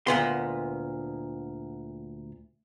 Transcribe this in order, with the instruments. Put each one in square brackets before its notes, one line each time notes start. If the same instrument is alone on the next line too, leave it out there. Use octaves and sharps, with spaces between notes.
[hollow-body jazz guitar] D2 A#2 B3 C6